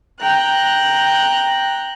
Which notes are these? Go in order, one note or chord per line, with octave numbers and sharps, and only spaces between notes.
G5 A#5 F#6